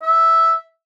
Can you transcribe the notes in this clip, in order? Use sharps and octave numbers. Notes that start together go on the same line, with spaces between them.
E5